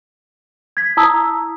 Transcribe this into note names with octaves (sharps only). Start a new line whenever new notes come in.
G#6 B6
E4 A5 A#5 D#6 E6